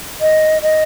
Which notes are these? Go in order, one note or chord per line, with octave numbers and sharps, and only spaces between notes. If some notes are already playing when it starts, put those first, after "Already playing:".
D#5
D#5